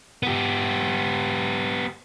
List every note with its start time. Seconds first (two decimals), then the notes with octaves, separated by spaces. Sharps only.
0.23 B3 G4